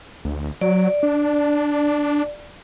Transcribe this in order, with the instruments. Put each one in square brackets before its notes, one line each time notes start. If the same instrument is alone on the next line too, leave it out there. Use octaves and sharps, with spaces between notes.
[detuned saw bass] D2
[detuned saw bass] F#3 [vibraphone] D5
[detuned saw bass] D4